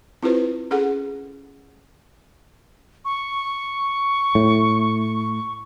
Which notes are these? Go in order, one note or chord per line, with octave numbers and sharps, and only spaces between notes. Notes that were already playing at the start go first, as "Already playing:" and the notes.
C4 E4 F4 G4 B4 C5
C#4 G#4 A4 F#5
C#6
A2